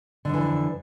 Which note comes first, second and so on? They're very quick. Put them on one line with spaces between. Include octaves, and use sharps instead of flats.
D3 F2 E3